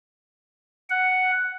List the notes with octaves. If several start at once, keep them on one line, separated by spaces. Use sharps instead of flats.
F#5